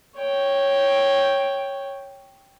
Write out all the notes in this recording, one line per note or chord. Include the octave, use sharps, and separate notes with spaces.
C#5 G5